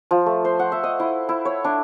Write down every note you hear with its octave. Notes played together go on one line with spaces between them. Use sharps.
F3
A3
C5
F#5
E5
D#5
E4
E4
C#5
D4